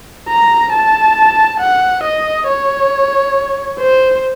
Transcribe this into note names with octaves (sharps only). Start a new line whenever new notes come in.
A#5
A5
F#5
D#5
C#5
C5